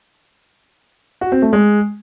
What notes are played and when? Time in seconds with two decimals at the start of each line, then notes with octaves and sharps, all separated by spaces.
1.21 F#4
1.32 C4
1.42 A3
1.53 G#3